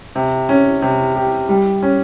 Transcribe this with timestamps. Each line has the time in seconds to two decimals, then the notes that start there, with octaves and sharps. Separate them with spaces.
0.16 C3
0.49 C#4
0.82 C3
1.16 G4
1.49 G3
1.83 C#4